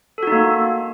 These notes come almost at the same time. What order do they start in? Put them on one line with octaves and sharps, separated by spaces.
A4 F#4 D#4 A#3